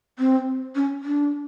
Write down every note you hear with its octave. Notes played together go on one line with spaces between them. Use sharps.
C4
C#4
D4